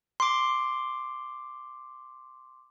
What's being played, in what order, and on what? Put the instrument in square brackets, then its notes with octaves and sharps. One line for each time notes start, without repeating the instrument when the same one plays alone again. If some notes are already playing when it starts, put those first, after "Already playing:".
[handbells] C6 D6